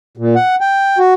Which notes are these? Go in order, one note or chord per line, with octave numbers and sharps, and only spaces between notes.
A#2
F#5
G5
F#4